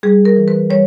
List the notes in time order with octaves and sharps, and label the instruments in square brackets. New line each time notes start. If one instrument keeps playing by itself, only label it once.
[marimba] G3 G#4
A#4
E3
B4
G3 C#5